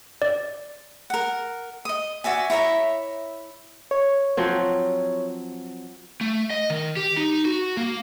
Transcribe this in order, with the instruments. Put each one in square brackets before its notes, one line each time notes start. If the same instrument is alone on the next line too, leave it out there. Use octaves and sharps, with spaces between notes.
[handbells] D5
[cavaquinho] A#4 F#5
D#5 D#6
F#4 D5 E5 G#5
E4 C#5 E5 A#5
[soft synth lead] C#5
[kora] F3 F#3 C4
[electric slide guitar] A3
D#5
D#3
G4
D#4
F#4
A#3